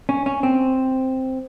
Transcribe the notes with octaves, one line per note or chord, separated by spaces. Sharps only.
C#4
C#4
C4